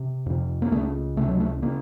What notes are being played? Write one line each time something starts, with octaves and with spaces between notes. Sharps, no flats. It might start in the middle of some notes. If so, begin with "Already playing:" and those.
Already playing: C3
F2 C3
A#3
C#2 C#3 A3
C#2 C3 A3
F#3
A3
C#3 A#3